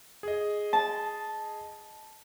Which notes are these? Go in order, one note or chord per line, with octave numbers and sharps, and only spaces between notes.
G#4 D#5
A5